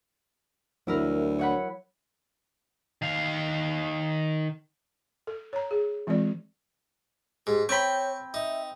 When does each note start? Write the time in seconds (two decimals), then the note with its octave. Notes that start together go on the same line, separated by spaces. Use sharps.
0.87 D2 F#3 E4 A#4
1.39 C#5 F#5 B5
3.02 D#3 F5
5.27 A4
5.53 C#5 A#5
5.71 G#4
6.07 E3 G#3 C4 F4 D5
7.47 G#2 G4
7.69 C4 C#5 G5 B5 C#6
8.34 D#4 E5